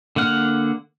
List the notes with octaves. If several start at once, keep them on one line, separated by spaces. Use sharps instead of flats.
D3 A#3 F#5 F6